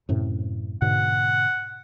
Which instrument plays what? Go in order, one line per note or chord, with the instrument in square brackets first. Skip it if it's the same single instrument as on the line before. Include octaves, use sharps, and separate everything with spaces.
[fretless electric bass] F#2 A2 C3
[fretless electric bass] G#2 B2 D3 [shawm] F#5